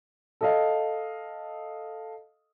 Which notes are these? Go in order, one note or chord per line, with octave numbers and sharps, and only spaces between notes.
A4 D#5 F5